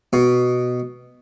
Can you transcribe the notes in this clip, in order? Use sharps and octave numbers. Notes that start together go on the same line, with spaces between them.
B2